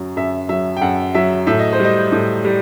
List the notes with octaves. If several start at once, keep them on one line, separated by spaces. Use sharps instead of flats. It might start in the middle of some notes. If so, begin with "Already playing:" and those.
Already playing: F#2 F#3
F#2 E5
F#3 E5
G5
F#2 F#5
F#3 E5
A2 E5
D#5
C5
G3
D#5
A2
G3